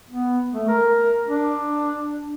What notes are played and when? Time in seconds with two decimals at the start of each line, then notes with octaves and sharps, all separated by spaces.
0.10 B3
0.54 A3
0.68 A#4
1.26 D4